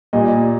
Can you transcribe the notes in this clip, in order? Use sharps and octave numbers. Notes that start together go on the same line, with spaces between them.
A#2 G3 A#3 D#5